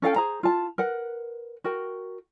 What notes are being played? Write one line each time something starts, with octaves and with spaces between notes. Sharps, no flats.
C#4 A4 F5 G5
G#4 C5 A#5
F4 A5
A#4 B4 F#5
F#4 A#4 G5